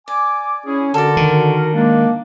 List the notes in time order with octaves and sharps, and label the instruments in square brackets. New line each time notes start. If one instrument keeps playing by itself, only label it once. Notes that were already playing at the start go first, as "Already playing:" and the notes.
[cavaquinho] D5 [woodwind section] G#5 D6
[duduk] C#4 [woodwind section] E4 G#4
[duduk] D3 [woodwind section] F#4 A#4 [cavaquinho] A4 D5
[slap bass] D#3
[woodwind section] G#3 D4 [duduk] A#3